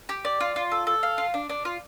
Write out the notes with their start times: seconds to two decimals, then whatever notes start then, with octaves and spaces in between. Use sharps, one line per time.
0.09 G4
0.25 D5
0.40 F4
0.56 F4
0.71 A4
0.87 A4
1.03 F5
1.18 F4
1.34 D4
1.49 D4
1.65 F4